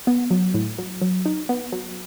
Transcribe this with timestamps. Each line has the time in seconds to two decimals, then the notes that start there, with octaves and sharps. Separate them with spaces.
0.07 B3
0.31 F#3
0.54 A2
0.78 F#3
1.02 F#3
1.26 D#4
1.49 B3
1.72 F#3